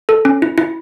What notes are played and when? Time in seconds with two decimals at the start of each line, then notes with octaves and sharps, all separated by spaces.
0.09 A4
0.25 C#4
0.42 E4
0.58 E4